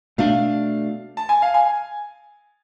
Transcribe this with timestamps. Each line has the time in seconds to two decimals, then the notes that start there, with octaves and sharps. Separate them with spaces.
0.18 B2 A3 D4 F5
1.17 A5
1.29 G#5
1.42 F5
1.54 G#5